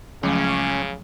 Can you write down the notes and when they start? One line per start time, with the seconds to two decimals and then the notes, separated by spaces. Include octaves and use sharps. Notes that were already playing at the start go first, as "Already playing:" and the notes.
0.23 C#2 C#3 F3 F#3 A3 C#4 D6